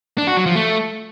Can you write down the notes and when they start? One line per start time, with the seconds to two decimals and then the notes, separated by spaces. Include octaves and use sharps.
0.18 D4
0.27 F#4
0.37 F#3
0.46 F3
0.56 A3